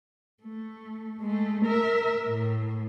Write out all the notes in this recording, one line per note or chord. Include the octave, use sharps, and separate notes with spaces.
A3
G#3 A3
A#4 E5
A2